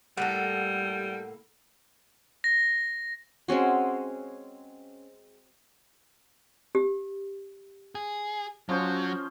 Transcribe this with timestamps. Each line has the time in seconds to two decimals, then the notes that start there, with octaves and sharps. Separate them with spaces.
0.17 A2 G3 A#3 A4 F#5
2.44 A#6
3.48 G#3 C4 C#4 F#4
6.75 G4
7.95 G#4
8.69 F3 F#3 C#4 C5